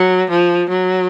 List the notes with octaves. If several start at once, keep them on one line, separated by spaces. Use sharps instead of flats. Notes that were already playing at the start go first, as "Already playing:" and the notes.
Already playing: F#3
F3
F#3